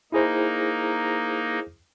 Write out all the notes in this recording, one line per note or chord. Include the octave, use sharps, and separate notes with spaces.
A#3 D#4 E4 G#4 C5